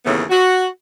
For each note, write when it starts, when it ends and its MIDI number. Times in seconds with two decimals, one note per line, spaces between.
0.04 0.23 39
0.04 0.23 45
0.04 0.23 49
0.04 0.23 52
0.04 0.23 59
0.30 0.67 66